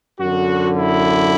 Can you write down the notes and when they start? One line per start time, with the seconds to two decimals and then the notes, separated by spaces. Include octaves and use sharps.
0.19 F#2 D3 F#4
0.76 E4